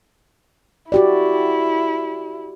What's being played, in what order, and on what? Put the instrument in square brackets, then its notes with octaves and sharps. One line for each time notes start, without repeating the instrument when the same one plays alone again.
[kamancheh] E4 [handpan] F#4 G4 D5